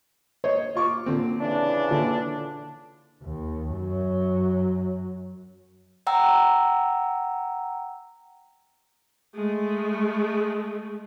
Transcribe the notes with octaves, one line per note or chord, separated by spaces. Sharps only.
C5 C#5 D#5
F4 C#6 D6
A#2 D3 C4
C#3 E3 D4
A#2 D3
D#2
F#2 F#3
F#5 G5 A#5 E6
G#3 A3